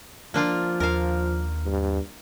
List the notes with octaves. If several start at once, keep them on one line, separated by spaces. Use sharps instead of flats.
F3 A#3 D4 F4
D#2 A#4 F5
G2